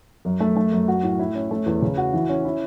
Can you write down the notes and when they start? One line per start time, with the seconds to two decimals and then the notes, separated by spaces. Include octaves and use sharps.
0.25 F#2
0.40 A3
0.56 A3
0.72 F#2
0.88 F#4
1.03 A2
1.19 E4
1.35 C#4
1.51 A3
1.66 E2
1.82 C#3
1.97 F#4
2.13 E3
2.29 C#4
2.45 E4